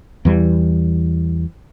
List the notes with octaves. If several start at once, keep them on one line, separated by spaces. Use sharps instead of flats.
E2 E3 G3